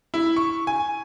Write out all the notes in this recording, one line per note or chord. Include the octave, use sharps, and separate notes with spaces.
E4
C#6
G#5